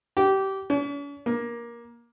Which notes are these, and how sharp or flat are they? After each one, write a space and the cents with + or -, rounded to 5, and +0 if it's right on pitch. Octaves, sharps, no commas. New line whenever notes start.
G4 -20
C#4 +45
A#3 +15